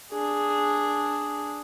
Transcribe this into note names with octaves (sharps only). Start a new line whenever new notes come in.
D4 G#4